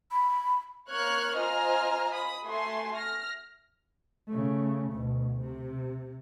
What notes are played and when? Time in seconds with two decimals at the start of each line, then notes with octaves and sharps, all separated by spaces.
0.11 B5
0.89 A#3 C#5 C#6 F6 F#6 G#6
1.38 F4 C5 D#5 G#5 A#5 F6
2.13 B5 D#6
2.44 A3 F#4 G#5 C6
2.94 F6 A#6
4.27 C#3 A3
4.91 D2 B2
5.40 C3